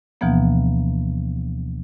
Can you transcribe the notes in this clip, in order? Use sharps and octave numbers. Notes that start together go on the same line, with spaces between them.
D2 B2 E3 F3 A#3 B3